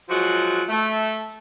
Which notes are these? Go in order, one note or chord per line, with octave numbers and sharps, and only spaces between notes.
F3 F#3 G#3 F#4
A3